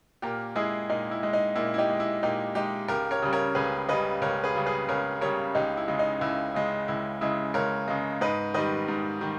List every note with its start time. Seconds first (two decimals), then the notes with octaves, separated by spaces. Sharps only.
0.22 A#2 G4 A#4
0.56 G#3 E4 G#4
0.89 A#2 D#4
1.11 E4
1.23 G#3
1.33 D#4
1.55 A#2 E4
1.74 E4
1.78 D#4 G4
1.90 G#3
2.00 E4
2.23 A#2 D#4 G4
2.55 G#3 D#4 G4
2.88 C#2 G4 A#4
3.11 A#4 C#5
3.22 C#3 G3
3.33 A#4 C#5
3.55 C#2 G#4 B4
3.88 C#3 G3 B4 D#5
4.21 C#2 A#4 C#5
4.44 G#4 B4
4.55 C#3 G3
4.66 G#4 B4
4.89 C#2 A#4 C#5
5.21 C#3 G3 A#4 C#5
5.55 C#2 D#4 G4
5.77 E4
5.88 C#3 G#3
5.99 D#4
6.21 C#2 E4
6.54 C#3 G#3
6.88 C#2 E4
7.21 C#3 G#3 E4
7.54 C#2 A#4 C#5
7.88 C#3 G#3
8.21 G#2 B4 D#5
8.54 D#3 G3 B4 D#5
8.88 G#2
9.21 D#3 G3